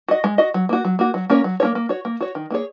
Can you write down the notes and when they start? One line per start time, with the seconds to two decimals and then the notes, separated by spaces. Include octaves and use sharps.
0.08 F#4 D#5
0.24 G#3
0.38 F#4 D#5
0.54 F#3
0.69 A#3 F#4
0.85 F#3
0.99 A#3 F#4
1.14 F#3
1.30 A#3 C#4 A#4 C#5
1.44 F#3
1.60 A#3 C#4 A#4 C#5
1.75 A#3
1.89 F#4 C#5
2.05 A#3
2.20 F#4 C#5
2.35 D#3
2.50 A#3 C#4 G#4 C#5